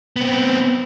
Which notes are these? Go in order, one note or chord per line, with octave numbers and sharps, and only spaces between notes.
B3 C4